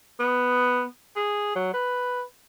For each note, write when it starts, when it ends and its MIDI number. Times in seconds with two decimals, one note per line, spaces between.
0.20 0.84 59
1.16 1.55 68
1.55 1.69 54
1.73 2.22 71